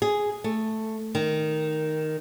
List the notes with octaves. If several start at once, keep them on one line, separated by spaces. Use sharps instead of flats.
G#4
A3
D#3